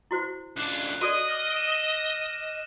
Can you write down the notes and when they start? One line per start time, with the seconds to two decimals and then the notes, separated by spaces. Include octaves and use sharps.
0.11 E4 F#4 C5
0.57 C#2 D4 F#6 C7
1.01 F#4 A4 D5 D#5 E6 D7 D#7
1.28 D6 F6 A#6
1.52 D7 E7